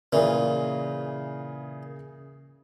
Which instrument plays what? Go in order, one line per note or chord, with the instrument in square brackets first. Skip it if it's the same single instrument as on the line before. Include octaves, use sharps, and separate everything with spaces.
[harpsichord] A#2 E3 [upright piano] C#3 G#4